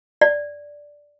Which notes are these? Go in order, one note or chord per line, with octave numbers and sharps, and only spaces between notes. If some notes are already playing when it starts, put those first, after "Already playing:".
D5